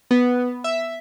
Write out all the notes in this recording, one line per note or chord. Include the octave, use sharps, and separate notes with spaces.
B3
E5